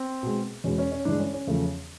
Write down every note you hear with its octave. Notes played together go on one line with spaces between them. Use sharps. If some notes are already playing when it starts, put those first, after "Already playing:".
Already playing: C4
B2 G#3
E2 B2 G#3 C#4
C#4
C#4
G2 E3 G#3 D4
C#4
C#4
E2 C#3 F3 A3